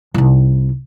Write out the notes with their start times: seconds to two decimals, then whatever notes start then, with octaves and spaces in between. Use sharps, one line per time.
0.14 C2 D#4